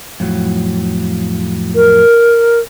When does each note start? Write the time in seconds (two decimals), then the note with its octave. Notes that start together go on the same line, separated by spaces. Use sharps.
0.20 F2 A2 F#3
1.75 A#4